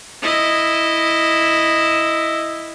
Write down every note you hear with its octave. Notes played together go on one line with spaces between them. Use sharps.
E4 D#5